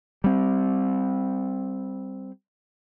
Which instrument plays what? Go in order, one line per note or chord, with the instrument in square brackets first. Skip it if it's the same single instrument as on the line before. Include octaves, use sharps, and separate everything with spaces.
[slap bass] G3 C4